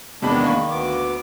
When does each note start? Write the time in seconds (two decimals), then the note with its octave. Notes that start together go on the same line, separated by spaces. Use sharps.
0.22 E2 C3 D#3 G#3 B3 D4 B5
0.44 A#3 B5 C#6
0.70 D2 B3 D6